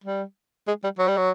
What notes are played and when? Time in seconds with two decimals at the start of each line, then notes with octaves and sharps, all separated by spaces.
0.04 G3
0.67 G#3
0.84 G3
0.98 F#3
1.08 G3
1.17 F#3